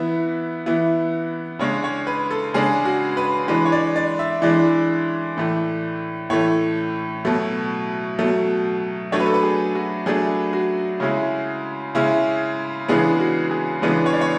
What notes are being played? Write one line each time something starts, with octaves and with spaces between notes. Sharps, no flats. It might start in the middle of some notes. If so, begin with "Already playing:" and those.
Already playing: E3 B3 E4 E5
E3 B3 E4
C#3 G#3 D4 C#5
C#5
B4
A4
C#3 G#3 D4 G#4
F#4
B4
E3 G#3 D4 B4
C#5
D5
D5
E5
E3 G#3 D4 D5
A2 E3 A3
A2 E3 A3 C#5
B2 F#3 A3
B2 F#3 A3
F#3 A3 D4 C#5
B4
A4
B4
G#4
F#4
F#3 A3 D4 G#4
F#4
C#3 G#3 C#4 E4
C#3 G#3 C#4 E4
C#3 E3 G#3 B3 D4 G#4
F#4
G#4
C#3 E3 G#3 B3 D4 B4
C#5
D5
C#5